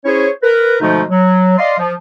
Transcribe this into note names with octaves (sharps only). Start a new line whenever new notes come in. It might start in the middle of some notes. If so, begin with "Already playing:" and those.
C#4 E4 G#4 C5 C#5
A#4 B4
B2 D3 F3 G#3 A3 D#4
F#3
D5 D#5 F5 C6
F3